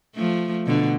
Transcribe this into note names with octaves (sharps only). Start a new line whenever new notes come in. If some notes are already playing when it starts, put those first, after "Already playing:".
F3 A3
B2 D3